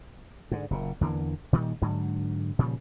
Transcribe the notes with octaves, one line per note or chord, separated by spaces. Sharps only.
G#2 D3
F#1 A#2
E2 D3 E3 A#3
A#2 D#3 G3
G#2 D3 F#3
A#2 C#3 F3 G3